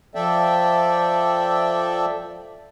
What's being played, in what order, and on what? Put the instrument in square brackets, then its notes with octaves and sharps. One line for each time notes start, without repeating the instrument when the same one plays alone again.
[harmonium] F3 A4 D5 E5 G5